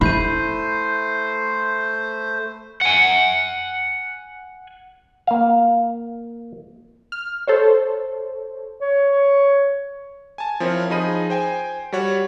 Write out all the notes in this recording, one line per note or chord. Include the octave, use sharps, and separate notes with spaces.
A3 E4 C5 B5 C6 G6 D#7
F#5 G#5
A#3 F5
F6
A4 C5 C#5
C#5
G#5 A5
F3 C4 E4 A#4 C#5
F3 D#4 G#4 D#5 B5 D#7
C5 G5 G#5
G3 F#4 C#5 F#5